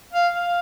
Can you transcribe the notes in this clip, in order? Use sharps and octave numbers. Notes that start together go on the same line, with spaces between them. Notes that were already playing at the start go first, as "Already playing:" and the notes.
F5
F5